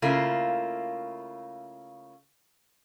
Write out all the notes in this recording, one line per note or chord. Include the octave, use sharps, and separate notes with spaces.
C#3 A3 A#3 E4 F4